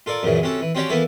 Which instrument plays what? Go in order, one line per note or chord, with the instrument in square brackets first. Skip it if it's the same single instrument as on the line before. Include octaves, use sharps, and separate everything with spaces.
[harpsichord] F4 A4 A#4 D5
F#2 A#2 C#3 E3
C3 C#4 F#4 A4
E3
C4 C#4 F#4 G4 C#5 D5
E3 A#3 B3 E4 A4